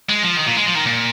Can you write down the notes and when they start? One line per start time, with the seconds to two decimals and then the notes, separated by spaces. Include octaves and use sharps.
0.09 G#3
0.23 F3
0.36 D#3
0.46 A#2
0.56 G#3
0.66 F3
0.75 D#3
0.86 A#2